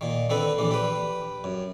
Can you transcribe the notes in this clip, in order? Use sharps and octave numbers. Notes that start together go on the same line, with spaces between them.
A#2 D#3
D3 C4 A4 B4
A#1 E3 D4
G4 B4
F#2